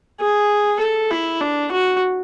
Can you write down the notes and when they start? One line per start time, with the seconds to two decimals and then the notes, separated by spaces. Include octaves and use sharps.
0.20 G#4
0.80 A4
1.11 E4
1.41 D4
1.72 F#4